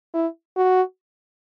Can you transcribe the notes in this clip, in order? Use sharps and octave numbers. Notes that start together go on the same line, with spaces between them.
E4
F#4